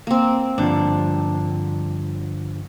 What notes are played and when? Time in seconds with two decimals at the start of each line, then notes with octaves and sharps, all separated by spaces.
0.07 A#3 C4
0.58 G2 D3 F3 D4